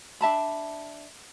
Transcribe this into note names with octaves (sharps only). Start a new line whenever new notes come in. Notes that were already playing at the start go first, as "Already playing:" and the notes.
D4 E5 A5 B5